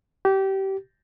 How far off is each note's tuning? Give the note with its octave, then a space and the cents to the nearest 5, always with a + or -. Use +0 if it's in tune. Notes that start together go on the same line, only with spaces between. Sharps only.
G4 -25